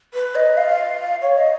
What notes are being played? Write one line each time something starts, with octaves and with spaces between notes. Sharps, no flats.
B4
D#5
F5
C#5
D#5